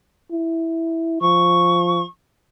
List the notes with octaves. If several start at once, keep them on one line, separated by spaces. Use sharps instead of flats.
E4
F3 C#6